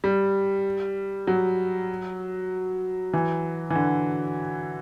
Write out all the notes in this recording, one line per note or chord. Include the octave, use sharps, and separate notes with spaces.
G3
F#3
E3
E3
D3